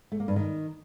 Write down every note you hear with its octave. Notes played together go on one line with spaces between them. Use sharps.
A3
A#3
G2
D#3